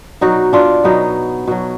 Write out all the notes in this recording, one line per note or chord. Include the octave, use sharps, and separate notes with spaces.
B2 F#3 D#4 F#4
D4 F4
B2 F#3 B3 D#4
B2 F#3